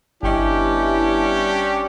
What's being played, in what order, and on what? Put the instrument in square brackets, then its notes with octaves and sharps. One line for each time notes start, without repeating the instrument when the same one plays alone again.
[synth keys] G1 D#5 [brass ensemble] G3 B3 E4 [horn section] C#4 D4 G4